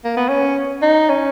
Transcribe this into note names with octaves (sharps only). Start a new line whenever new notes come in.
A#3
B3
C#4
D#4
C#4